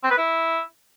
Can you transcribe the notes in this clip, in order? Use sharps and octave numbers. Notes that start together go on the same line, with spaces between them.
C4
B4
E4